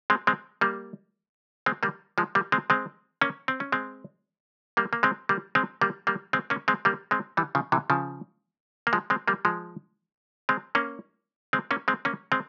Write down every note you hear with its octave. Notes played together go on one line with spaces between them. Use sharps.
G#3 C4
G#3 C4
G3 A#3
G#3 C4
G3 A#3
F3 G#3
G3 A#3
G#3 C4
G#3 C4
A#3 C#4
C4
C#4
G#3 C4
G3 A#3
A#3
G#3 C4
G3 A#3
G#3 C4
G3 A#3
G3 A#3
G#3 C4
A#3 C#4
G#3 C4
G3 A#3
G#3 C4
E3 G3
C#3 F3
C3 E3
C#3 F3
A#3
F3 G#3
G#3 C4
G3 A#3
F3 G#3
G#3 C4
A#3 C#4
G#3 C4
A#3 C#4
G#3 C4
A#3 C#4
G#3 C4